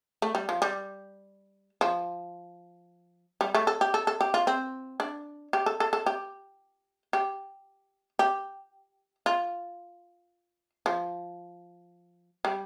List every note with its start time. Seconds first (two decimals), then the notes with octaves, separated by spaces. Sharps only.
0.22 A3
0.35 G3
0.49 F3
0.62 G3
1.81 F3
3.41 G3
3.55 A3
3.67 A4
3.81 G4
3.94 A4
4.07 A4
4.21 G4
4.34 F4
4.47 C4
5.00 D4
5.53 G4
5.66 A4
5.80 A4
5.93 A4
6.06 G4
7.13 G4
8.19 G4
9.26 F4
10.86 F3
12.45 G3